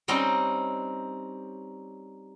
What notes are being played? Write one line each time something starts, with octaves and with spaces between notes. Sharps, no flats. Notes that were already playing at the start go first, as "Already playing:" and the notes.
G3 C4 C#4 D#4 G5 A#5